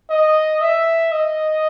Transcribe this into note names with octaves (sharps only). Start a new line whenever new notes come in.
D#5
E5
D#5